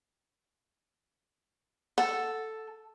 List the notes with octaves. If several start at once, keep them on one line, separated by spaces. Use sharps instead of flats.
A4 F#5